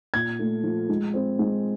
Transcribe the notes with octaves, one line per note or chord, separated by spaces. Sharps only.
A#2 G#6
A3
F3
G#3
C4
G#3